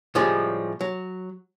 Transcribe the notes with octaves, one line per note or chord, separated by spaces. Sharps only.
A2 C#3 F3 G3 G#3
F#3